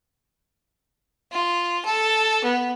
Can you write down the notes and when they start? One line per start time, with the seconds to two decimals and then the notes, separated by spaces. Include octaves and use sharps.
1.32 F4
1.85 A4
2.44 B3